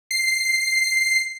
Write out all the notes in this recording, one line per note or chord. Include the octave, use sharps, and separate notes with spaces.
C7